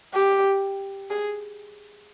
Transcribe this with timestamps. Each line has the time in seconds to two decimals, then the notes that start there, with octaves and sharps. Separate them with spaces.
0.14 G4
1.10 G#4